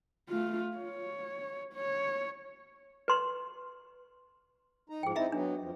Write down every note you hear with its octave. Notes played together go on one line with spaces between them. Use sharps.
A3 F4
C#5
C#5
B4 C6
D#4 A#5
G#2 F3 G#4 G5
C4 D#4 E4 D#5 E5 A#5
F#3 B3 D4
F2 F3